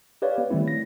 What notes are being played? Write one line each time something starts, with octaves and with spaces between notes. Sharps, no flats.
G4 B4 C#5 D5 F5
B3
D#3 G3 A3 C4 E4
A#6